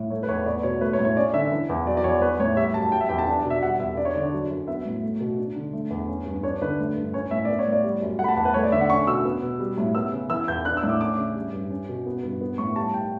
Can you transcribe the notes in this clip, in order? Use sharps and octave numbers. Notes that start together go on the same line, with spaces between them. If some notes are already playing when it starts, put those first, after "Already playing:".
Already playing: A2
A3 C#5
B4
E2 C#5
B3 D5
B2 C#5
A3 B4
C#5
A2
C#5
C#4 D5
D3 E5
E3
E2
F#3 D5
D5
E2 C#5
B3 B4
A2 C#5
G3 E5
F#2 A5
G3 G5
E5
E2 G5
A5
D4
B2
E5
G3 F#5
E2 E5
D4 D5
C#5
D3 D5
F#3
F#2
B3 E5
A2
A3
B2
D4
D3
A3
E2
C#4
G2
D4 C#5
D3 B4
A3
G2
C#4 C#5
A2 E5
B3 D5
C#5
A2
D5
G3
F#2
A3 F#5
B5
A5
E2 F#5
B4
A3 C#5
D5
D3 E5
F#5
C#4 C#6
B2 E6
B3
B2
G3
A2
B3 E6
C#3
E3 E6
E2 G6
D4 F#6
E6
A2
D6
C#4 D6
C#3
G3
G2
C#4
B2
B3
G2
B3
A2 C#6
G3 A5
G5